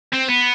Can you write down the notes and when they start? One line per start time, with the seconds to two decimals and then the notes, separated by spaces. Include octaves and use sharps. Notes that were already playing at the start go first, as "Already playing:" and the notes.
0.14 C4
0.29 B3